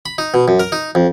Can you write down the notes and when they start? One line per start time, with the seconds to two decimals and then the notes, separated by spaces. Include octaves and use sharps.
0.06 B5
0.18 D#4
0.34 B2
0.48 F#2
0.60 A#4
0.72 D#4
0.95 F2